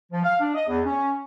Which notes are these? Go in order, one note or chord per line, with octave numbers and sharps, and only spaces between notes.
F3
F5
D4
D#5
E2
C#4